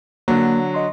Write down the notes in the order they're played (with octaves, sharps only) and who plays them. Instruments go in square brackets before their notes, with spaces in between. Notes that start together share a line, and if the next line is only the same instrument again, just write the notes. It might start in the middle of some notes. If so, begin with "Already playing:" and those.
[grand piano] D3 F#3 [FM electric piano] A#3
[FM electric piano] D#5 C6